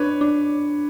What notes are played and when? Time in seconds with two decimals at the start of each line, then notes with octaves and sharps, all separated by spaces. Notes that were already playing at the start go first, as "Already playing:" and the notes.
Already playing: D4 B4 C#5
0.21 D4